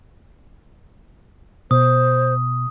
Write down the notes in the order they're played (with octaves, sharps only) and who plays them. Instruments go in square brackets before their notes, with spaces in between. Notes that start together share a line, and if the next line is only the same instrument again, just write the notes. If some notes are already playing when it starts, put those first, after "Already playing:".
[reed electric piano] B2 [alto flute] C5 [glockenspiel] D#6